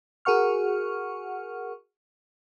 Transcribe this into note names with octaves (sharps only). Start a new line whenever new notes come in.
F#4 G#4 A#4 F#5 C#6 F6